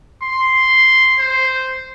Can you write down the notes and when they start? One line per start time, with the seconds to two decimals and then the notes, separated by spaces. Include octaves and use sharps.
0.23 C6
1.20 C5